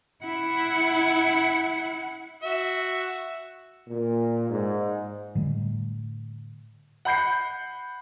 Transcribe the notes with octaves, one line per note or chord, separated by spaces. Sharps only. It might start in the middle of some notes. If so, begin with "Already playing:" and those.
E4 F#5
F#4 E5
A#2
G#2
A2 D3 G3 A3
F#5 B5 G6 C7 C#7